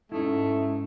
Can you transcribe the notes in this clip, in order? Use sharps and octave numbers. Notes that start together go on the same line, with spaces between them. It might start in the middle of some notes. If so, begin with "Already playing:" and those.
G#2 A3 C#4 D#4 E4